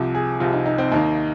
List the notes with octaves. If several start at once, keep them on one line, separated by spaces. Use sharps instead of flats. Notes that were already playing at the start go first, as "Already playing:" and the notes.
Already playing: C2 C3 F3
G#4
C2 C3 F3 F4
D#4
D#4
C4
D#2 D#3 A#3 D#4